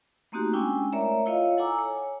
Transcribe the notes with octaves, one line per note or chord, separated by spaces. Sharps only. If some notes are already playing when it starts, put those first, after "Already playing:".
A3 A#3 C4 D#4 F#4 G4
G#3 C#4 D4 E4 G5 G#5
A3 A#4 C#5 D5 E5 A#5
E4 F4 C#5 D#5 F5
A4 F#5 G#5 A#5 D6 E6
C#5 G#5